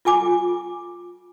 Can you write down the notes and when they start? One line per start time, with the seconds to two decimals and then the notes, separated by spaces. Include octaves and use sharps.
0.05 F4 A4 G#5 D6